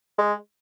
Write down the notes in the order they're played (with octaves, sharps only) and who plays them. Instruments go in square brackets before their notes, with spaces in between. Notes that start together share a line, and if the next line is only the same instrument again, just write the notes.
[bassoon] G#3